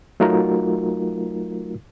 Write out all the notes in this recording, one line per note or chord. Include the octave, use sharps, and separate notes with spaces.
F#3 A3 D#4 F4 F#4 A#4